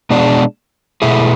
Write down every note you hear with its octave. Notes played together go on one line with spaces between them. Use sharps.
B2 G#3 D4
B2 A3 E4 G#4